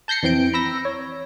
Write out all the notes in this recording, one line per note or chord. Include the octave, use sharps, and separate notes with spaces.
A5 G6 A#6 C7 C#7
F2 E3 C4 G6 D7
A#5 B5 E6 A#6
C#5